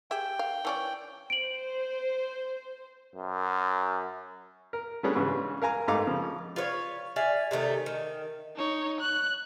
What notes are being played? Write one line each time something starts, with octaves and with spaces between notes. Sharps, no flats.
G4 G#4 E5 G5
F5
E3 C#4 D5
C5 D7 F#7
F#2
A#4
G3 A3 B3 C#4 D4 G#4
G#2 C#3 E3
A#4 F5 G#5 A#5
G#2 A3 D#4 F5 A#5 D6
C#3 F3
F4 B4 C#5
D5 E5 F5 G#5
C3 D#3 A3 D#4
D#3
D#4 C#5
F#6